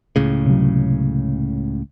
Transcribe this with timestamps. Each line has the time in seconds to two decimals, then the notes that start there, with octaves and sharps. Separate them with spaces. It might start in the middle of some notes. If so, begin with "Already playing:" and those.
0.16 C#2 A2 C#3
0.46 C3 F#3